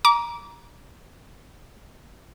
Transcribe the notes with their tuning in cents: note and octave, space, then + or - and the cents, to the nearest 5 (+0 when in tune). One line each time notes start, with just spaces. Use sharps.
A#5 +20 D6 -20